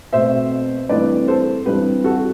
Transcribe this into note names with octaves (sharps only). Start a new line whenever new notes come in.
B2 A3 C4 C5 E5
G2 E3 A3 C4 B4 D5
A4 C5
G2 E3 G3 C4 G4 B4
F#4 A4